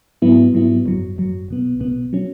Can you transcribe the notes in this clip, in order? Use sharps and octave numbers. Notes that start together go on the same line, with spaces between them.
G#2 F#3 B3 E4
G#2 F#3 B3 E4
G#1 F#2 F#3
G#1 F#2 F#3
B1 B2 B3
B1 B2 B3
F#3 C#4